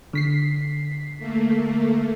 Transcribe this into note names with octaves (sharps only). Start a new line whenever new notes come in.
D3 B6 C7
A3 A#3